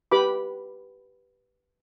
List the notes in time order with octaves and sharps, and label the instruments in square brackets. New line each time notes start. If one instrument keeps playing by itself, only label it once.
[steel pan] G4 B4 B5 D6